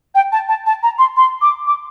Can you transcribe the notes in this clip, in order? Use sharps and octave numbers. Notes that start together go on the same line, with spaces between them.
G5
A5
A5
A5
A#5
C6
C6
D6
D6